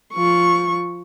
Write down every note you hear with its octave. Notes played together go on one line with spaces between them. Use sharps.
F3 C#6